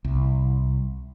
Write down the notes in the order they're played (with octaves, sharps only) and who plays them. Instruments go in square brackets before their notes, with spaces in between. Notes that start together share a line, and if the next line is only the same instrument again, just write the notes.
[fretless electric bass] C2